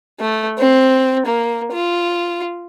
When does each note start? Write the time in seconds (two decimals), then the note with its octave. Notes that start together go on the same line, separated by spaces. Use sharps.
0.20 A3
0.58 C4
1.26 A#3
1.72 F4